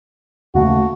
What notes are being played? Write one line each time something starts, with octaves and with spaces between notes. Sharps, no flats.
D#2 C#3 A3 F#4